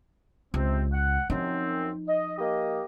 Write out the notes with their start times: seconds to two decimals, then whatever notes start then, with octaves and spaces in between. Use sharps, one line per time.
0.54 C#2 C3 C4
0.92 F#5
1.30 F#2 F3 C4 D#4
2.07 D#5
2.38 A#3 G4 D#5